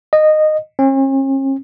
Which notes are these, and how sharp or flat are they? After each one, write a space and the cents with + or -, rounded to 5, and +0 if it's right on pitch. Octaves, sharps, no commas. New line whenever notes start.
D#5 -15
C#4 -45